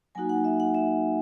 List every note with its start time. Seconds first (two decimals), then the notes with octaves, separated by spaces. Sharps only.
0.15 F#3 A#3 D#4 F#4 G#5
0.29 F#5
0.44 E5
0.60 F#5
0.75 E5